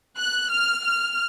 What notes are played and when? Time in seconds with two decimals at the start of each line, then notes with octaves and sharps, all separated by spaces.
0.18 F#6
0.51 F6
0.85 F6